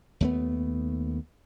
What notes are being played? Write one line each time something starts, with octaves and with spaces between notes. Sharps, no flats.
D#2 A3 B3